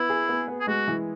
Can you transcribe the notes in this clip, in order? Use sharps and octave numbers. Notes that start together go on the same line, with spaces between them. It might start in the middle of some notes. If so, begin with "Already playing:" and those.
Already playing: B3 E4
G#4
B3
B3
G#4
G#3 F#4
E3